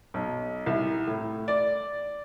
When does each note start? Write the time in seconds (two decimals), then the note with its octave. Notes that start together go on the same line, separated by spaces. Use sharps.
0.14 B1
0.66 C2
1.07 A2
1.48 D5